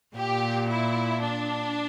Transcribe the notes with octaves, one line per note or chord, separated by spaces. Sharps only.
A#2 G4
E4
D4